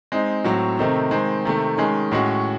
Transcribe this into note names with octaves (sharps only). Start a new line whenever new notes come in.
G#3 C4 D#4
A2 F#3 C4 F#4
C3 D#3 A3 C4 D#4
D#3 G#3 C4
C3 D#3 A3
D#3 G#3 C#4 G#4
A2 G#3 C#4 F#4